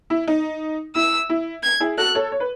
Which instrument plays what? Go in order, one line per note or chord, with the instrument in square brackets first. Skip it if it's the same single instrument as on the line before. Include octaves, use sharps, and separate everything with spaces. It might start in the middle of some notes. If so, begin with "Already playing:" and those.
[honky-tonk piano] E4
D#4
[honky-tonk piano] E4 [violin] E6
[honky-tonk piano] E4
[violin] G#6
[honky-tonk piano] E4 G#4
[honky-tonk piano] F#4 A4 [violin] F#6
[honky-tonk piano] A4 C#5
C#5
B4